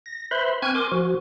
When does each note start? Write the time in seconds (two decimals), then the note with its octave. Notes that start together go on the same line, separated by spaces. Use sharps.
0.06 A#6
0.31 B4 C5 E5 B5 C6
0.62 C4 G#5 C#6 F6 F#6 G#6
0.75 A#4 G#5 C6 D6
0.92 F3 F#4